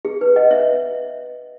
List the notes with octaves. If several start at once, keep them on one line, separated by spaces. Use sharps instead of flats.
G#4
B4
D#5 F#5
C#5 E5